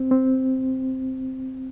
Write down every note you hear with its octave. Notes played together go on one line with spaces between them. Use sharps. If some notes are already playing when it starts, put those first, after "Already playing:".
Already playing: C4
C4